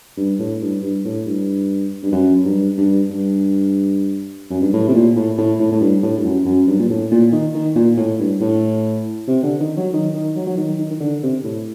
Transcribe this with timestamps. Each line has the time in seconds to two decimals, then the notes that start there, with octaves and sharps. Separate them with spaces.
0.17 G2
0.39 A2
0.61 G2
0.82 G2
1.05 A2
1.26 G2
2.03 G2
2.12 F#2
2.45 G2
2.78 G2
3.10 G2
4.50 F#2
4.62 G2
4.73 A2
4.88 C3
4.94 A#2
5.16 A2
5.38 A2
5.59 A2
5.72 A2
5.81 G2
6.03 A2
6.17 G2
6.24 F#2
6.45 F#2
6.67 G2
6.79 A#2
6.89 A2
7.11 A#2
7.32 D#3
7.55 D#3
7.75 A#2
7.97 A2
8.19 G2
8.41 A2
9.27 C3
9.43 D3
9.60 D#3
9.77 F#3
9.93 D#3
10.14 D#3
10.36 F#3
10.47 F#3
10.57 D#3
10.79 D#3
10.91 D#3
11.00 D3
11.23 C3
11.44 A2